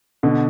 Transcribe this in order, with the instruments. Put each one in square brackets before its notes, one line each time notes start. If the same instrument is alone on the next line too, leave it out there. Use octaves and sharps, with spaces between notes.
[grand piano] B2 D3